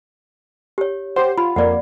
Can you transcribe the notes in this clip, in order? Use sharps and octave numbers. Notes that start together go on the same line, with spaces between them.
G4 C#5
G4 C5 F#5
F4 B5
F2 A#3 D5 F#5